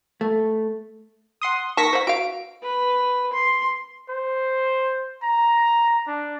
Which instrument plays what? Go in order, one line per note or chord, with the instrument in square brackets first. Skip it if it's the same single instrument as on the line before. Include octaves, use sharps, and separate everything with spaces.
[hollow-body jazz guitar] A3
[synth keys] F#5 C6 D#6
[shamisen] D#3 A#3 A5 [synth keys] C#6 A#6 B6
[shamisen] C5 F#5
[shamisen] F#4 F5 [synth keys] D7
[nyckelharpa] B4
C6
[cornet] C5
A#5
D4